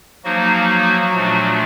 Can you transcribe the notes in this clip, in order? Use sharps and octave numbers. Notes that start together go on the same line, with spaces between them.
F3 F#3 A#3 D#4 F#4
A#2 F3 A3 D4